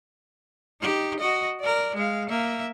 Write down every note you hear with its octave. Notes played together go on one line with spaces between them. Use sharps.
D#4 G4
F#4 D#5
A#4 D5
G#3 F5
A#3 E5